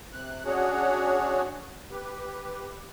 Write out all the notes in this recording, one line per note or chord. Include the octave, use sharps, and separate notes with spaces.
C3 F#6
C#4 D4 F#4 G#4 C#5 F#5
G4 B4